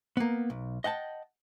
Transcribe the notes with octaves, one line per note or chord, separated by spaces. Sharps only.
A#3 B3
B1
D#5 F#5 G5 A5